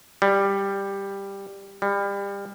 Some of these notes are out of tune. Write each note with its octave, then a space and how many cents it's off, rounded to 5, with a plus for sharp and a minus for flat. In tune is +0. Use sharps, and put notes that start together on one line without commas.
G3 +10
G3 +30